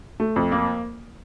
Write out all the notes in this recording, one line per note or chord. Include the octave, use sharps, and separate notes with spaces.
A3
F2
A#3